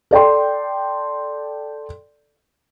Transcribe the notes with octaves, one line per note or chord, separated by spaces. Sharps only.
A4 D5 G5 C6